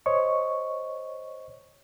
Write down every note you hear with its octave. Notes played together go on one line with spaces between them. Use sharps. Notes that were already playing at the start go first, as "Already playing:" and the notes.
C5 C#5 D#5 C#6